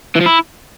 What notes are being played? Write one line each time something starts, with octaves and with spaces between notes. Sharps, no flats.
E3
F3
E4